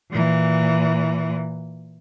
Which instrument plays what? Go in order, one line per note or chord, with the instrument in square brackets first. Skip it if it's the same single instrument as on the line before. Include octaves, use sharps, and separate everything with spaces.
[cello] A#2 E3